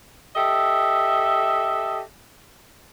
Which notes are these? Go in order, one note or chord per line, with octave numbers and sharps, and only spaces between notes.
G4 A4 D#5 E5